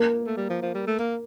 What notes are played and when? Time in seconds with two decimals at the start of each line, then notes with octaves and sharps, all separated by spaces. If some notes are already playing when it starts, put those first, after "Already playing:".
Already playing: A#3
0.26 A3
0.37 G3
0.50 F3
0.62 F3
0.75 G3
0.87 A3
0.99 A#3